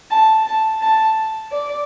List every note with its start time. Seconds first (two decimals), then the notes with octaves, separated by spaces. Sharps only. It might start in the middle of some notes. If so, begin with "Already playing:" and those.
0.11 A5
0.46 A5
0.82 A5
1.52 D5